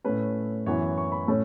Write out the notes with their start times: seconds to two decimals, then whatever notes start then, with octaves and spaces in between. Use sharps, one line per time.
0.04 A2 A3 C#4 B4
0.66 F#2 E3 B3 E4 C#5
0.98 C#6
1.12 B5
1.27 A2 A3 C#4 C#5